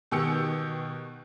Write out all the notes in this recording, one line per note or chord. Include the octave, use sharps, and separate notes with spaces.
B2 D#3 G4 E6 C#7